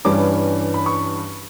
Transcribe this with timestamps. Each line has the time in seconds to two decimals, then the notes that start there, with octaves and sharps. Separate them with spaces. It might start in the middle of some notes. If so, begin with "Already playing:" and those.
0.05 G2 E3 G3 C#4 D6
0.74 B5
0.86 C#6